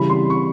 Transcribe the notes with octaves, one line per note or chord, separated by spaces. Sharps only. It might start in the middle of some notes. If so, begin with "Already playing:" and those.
Already playing: C#3 E3 G3 B5
C6
C#6